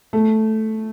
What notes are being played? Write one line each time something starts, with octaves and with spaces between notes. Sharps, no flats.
A3